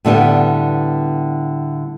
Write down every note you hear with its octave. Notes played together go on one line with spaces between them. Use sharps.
A2 D3 G3 B3